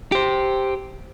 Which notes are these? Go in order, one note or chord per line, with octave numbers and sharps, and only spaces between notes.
G4 C5